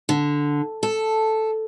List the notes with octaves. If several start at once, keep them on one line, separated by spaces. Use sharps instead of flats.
D3
A4